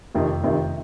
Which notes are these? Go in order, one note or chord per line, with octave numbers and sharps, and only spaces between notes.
F1 F2 C3 D#3
F1 F2 C3 D#3